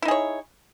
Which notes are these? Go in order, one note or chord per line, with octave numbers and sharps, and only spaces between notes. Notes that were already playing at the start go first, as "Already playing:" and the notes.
D#4 E4 G#4 C#5